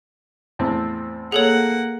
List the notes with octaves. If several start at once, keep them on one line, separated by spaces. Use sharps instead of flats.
E2 A2 C4
A#3 G#4 A4 C#5 F#5